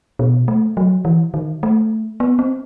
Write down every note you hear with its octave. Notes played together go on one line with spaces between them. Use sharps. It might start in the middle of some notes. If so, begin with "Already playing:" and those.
B2
A3
F#3
E3
D#3
A3
B3
C4